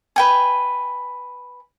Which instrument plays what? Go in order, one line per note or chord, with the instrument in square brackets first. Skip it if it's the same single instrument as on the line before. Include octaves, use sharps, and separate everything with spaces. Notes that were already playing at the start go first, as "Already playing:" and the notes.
[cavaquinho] B4 G5 G#5